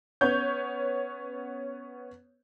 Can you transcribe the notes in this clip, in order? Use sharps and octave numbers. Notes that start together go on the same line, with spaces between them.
B3 C#4 C#5 G6